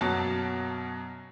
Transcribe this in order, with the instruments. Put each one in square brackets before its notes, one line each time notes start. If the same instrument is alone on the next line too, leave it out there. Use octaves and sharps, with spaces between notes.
[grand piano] F#2 B2 F#3 A#3 B3 A5